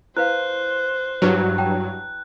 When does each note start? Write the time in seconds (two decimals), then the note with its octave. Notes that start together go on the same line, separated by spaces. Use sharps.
0.17 E4 B4 C5 F5 F#6
1.22 G2 F#3 E4 B4
1.58 G5 A5 A#5